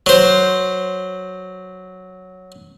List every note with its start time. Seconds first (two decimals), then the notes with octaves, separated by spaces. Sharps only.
0.06 F#3 C5